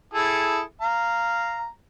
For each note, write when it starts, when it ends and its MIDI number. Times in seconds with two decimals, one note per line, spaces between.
0.14 0.60 64
0.14 0.60 68
0.14 0.60 69
0.81 1.67 77
0.81 1.67 82